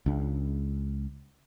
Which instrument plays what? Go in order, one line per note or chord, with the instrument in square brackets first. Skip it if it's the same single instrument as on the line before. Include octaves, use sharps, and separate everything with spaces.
[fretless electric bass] C#2 D4